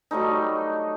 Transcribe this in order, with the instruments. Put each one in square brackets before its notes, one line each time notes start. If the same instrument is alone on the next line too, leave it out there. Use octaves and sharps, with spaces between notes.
[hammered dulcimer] F#3 G3 A3 D#4